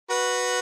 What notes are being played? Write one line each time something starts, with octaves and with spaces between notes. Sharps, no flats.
F#4 B4